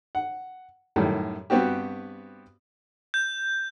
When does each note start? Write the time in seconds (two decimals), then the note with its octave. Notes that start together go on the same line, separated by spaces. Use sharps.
0.15 F#5
0.96 F#2 A2 D#3 G3
1.50 G2 B3 C4 F#4 G4
3.14 G6